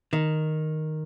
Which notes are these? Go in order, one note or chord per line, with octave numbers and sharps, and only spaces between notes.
D#3